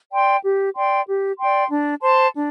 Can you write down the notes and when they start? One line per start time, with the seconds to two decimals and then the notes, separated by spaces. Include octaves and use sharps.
0.11 D5 G5 C6
0.43 G4
0.76 D5 G5 C6
1.08 G4
1.39 D5 G5 C6
1.70 D4
2.02 C5 A5 C6
2.35 D4